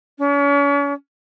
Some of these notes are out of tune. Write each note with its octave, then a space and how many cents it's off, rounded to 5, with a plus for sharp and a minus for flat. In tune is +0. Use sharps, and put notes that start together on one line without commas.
C#4 +40